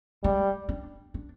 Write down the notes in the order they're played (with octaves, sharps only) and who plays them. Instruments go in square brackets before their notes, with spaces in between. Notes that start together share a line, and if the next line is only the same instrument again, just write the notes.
[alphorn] G3 [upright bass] G#3
[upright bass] D4
D4